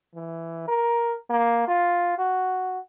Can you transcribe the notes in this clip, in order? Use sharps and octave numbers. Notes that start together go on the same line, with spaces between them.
E3
A#4
A#3
F4
F#4